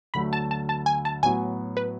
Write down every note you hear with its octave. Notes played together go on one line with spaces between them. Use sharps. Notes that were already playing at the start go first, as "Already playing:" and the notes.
D2 D3 F#3 A3 B5
A5
A5
A5
G#5
A5
A2 F#3 B3 F#4 G#5
B4